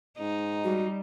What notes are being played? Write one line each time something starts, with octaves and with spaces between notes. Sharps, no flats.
G#2 D#4
G3 F#4